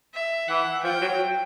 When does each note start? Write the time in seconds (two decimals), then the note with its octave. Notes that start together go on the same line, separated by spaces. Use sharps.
0.14 E5
0.48 E3 F#5
0.84 F3 G5
1.01 F#3